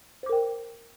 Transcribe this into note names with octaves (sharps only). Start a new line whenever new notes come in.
A#4 C5 G5 D6